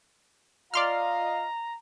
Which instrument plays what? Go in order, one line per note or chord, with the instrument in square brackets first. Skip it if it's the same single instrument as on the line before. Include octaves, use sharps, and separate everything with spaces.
[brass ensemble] F4 D#5 F5 [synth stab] D5 C6 F6 [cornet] A#5